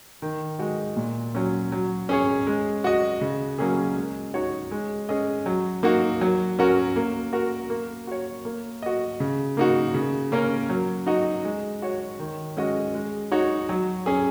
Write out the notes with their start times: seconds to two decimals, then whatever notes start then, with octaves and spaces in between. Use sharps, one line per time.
0.22 D#3
0.59 G#3 F#4 D#5
0.96 A#2
1.35 F#3 C#4
1.72 F#3
2.09 C#4 G#4 C#5
2.47 G#3
2.84 F#4 D#5
3.21 C#3
3.58 F#3 A#3 C#4 G#4
3.97 G#3
4.34 D#4 F#4 C#5
4.71 G#3
5.09 C#4 G#4 D#5
5.46 F#3
5.83 A#3 D#4 F#4
6.21 F#3
6.59 C#4 F#4 A#4
6.96 A#3
7.33 F#4 A#4
7.70 A#3
8.07 F#4 C#5
8.45 A#3
8.82 F#4 D#5
9.20 C#3
9.57 A#3 D#4 F#4
9.94 C#3
10.32 A#3 C#4 A#4
10.70 F#3
11.07 D#4 F#4 D#5
11.44 G#3
11.82 F#4 C#5
12.19 D#3
12.57 G#3 C#4 F#4 D#5
12.94 G#3
13.32 D#4 F#4 C#5
13.69 F#3
14.06 C#4 G#4